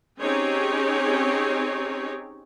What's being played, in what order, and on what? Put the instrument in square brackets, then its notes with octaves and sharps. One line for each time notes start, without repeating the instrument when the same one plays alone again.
[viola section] C4 C#4 D#4 G4 G#4 C#5